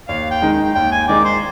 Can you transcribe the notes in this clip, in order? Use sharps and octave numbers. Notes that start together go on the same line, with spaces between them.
D#2 F5
G5
D#3 G#3 D#4
G5
D#2 G5
G#5
D#3 G#3 D#4 D5
C5